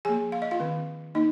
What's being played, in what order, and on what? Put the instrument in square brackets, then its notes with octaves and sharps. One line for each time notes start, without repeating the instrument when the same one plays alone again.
[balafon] F3 A#3 G#4 G#5
F5
D#5
F4 F5
D#3 C4
A#3 D#4 D#5